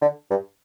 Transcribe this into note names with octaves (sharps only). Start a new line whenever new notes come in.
D3
G2